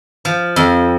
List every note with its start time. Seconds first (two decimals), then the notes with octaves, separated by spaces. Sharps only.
0.25 F3
0.56 F2